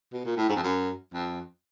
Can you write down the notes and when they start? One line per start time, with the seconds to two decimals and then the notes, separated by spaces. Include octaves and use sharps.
0.13 B2
0.25 A#2
0.37 A2
0.49 G#2
0.56 F2
0.63 F#2
1.13 F2